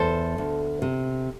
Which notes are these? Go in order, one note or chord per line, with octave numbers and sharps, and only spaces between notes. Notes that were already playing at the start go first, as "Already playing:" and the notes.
Already playing: E2 A4 C5
D2
C3